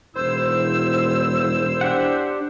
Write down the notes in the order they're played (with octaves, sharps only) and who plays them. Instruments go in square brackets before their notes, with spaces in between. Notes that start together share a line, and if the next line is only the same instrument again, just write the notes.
[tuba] E1 [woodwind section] D#3 E4 E6 [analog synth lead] C5
[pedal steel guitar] D4 G4 F#5